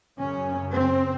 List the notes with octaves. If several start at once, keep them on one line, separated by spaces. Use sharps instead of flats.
F#2 C#3 C#4
C4